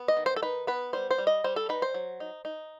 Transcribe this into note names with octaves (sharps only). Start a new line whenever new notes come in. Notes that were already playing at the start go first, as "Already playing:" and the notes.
Already playing: B3
D#5
D#3
C5
A4
D#4 B4
B3 B4
G3 C5
C5
G3
D#5
G3 C5
A4
D#4 B4
C5
F#3
D#4
D#4